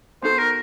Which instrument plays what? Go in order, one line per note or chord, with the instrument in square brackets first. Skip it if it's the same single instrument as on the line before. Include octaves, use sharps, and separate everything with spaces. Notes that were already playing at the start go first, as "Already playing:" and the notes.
[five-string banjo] B3 D#4 F#4 A4 [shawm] C5
[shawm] A#4